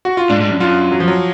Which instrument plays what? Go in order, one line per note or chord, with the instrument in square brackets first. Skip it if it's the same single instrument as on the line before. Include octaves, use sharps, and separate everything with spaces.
[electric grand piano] F#4
F4
[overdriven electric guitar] G#2 [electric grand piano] D4
[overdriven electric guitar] G#2
F#2
[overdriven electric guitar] F#2 [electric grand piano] F4
[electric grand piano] F#3
F3
F#3